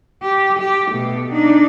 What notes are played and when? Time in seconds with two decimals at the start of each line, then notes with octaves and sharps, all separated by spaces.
0.23 G4
0.59 G4
0.91 B2 A3
1.32 D4 D#4